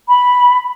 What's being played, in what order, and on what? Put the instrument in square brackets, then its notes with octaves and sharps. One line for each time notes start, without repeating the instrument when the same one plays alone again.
[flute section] B5